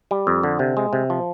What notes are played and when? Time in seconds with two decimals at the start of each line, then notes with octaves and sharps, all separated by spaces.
0.11 G3
0.27 F2
0.43 D3
0.59 C3
0.77 G#3
0.93 C3
1.10 F3